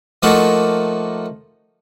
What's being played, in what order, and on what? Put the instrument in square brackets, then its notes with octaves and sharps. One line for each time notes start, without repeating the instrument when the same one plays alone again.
[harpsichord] F3 A3 A#3 D#4 F#4